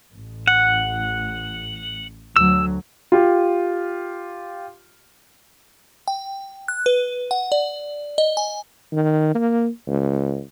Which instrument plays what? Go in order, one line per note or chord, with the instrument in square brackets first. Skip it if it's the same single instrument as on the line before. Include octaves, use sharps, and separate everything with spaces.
[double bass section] A1
[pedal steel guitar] F#5
[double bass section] D2 F#3 [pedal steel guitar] E6
[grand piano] F4 G4
[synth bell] G5
F#6
B4
F#5
D5
D#5
G#5
[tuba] D#3
A#3
C#2